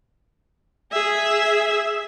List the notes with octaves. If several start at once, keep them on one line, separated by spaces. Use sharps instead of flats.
G#4 E5